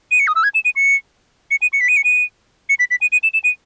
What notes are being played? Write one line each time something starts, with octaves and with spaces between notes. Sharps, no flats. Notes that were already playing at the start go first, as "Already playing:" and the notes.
D#7
C#7
D#6
E6
G#6
E7
D#7
C#7
C#7
D#7
C#7
B6
D#7
C#7
D#7
C#7
B6
B6
D#7
D#7
E7
E7
D#7